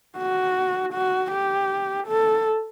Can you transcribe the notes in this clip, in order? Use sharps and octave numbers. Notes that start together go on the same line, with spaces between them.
F#4
F#4
G4
A4